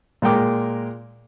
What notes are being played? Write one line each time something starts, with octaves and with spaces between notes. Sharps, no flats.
A#2 G#3 A#4 G5 D6